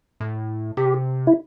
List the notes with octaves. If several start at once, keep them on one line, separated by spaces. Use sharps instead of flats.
A2
C3 G4
E4